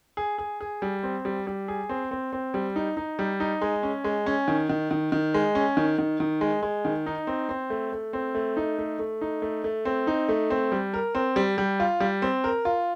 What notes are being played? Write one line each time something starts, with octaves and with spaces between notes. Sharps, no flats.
G#4
G#4
G#4
G3
C4
G3
G3
G#4
C4
C4
C4
G3
D#4
D#4
G3
D#4
G#3
C#4
G#3
C#4
D#3
D#3
D#3
D#3
G#3
C#4
D#3
D#3
D#3
G#3
G#3
D#3
D#4
C4
C4
A3
A3
C4
A3
D#4
A3
A3
D#4
A3
A3
C4
D#4
A3
C4
G3
A#4
C4
G3
G3
F4
G3
C4
A#4
F4